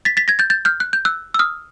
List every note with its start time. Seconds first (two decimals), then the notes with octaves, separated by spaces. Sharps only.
0.05 A6 B6
0.17 A6 B6
0.28 G#6 A#6
0.39 G6 A6
0.50 G6 A6
0.65 F6 G6
0.80 F#6
0.93 G6
1.05 E6 F#6
1.34 E6
1.39 D#6 F6